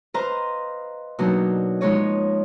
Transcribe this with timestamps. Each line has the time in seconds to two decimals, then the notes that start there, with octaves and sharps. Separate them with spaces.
0.14 B4 C5 D#5 F5 A#5
1.19 B2 F#3 A#3 B3 D4 D#4
1.81 F3 G#3 B3 D#4 C#5 D#5